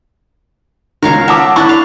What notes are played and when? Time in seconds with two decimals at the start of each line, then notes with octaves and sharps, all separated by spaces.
1.03 C#2 D#3 A#4 C#5 F5
1.28 E5 F#5 A5 D6
1.56 D4 E4 C#6 F#6
1.69 F5